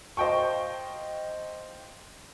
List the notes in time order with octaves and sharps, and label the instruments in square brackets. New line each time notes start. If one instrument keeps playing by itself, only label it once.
[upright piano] C5 D#5 F5 G5 A5 C#6